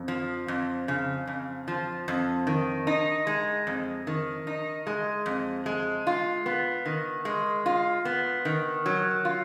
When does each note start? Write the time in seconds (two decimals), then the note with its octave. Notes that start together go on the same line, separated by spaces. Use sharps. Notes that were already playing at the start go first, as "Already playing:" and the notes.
Already playing: F2
0.08 F3
0.48 F2
0.88 C#3
1.27 F2
1.68 F3
2.08 F2
2.47 D#3
2.87 D#4
3.27 G#3
3.67 F2
4.07 D#3
4.47 D#4
4.87 G#3
5.26 F2
5.66 G#3
6.07 F4
6.46 B3
6.86 D#3
7.25 G#3
7.66 F4
8.05 B3
8.45 D#3
8.86 F#3
9.25 F4